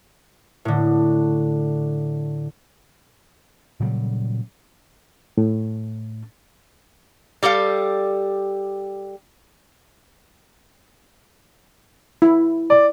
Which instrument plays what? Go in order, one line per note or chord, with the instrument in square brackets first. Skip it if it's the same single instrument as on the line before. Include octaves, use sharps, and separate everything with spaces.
[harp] A2 D3
[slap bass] A#2 C#3 F#3 G3
[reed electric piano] A2
[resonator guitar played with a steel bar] G3 G4 A4 F5
[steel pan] E4
[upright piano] D5